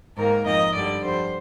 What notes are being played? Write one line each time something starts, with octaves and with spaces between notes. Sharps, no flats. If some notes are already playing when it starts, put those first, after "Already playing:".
G#2 D#3 A#3 A#4
F2 D#3 A#3 D#5
G2 D3 G3 D5
F2 D3 G3 C5